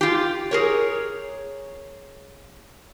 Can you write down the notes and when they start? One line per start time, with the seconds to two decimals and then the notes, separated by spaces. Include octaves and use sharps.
0.01 F4 G4
0.51 G#4 A#4 C#5